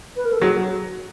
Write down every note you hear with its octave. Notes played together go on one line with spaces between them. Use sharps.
B4
A#4
A4
F#3 G#4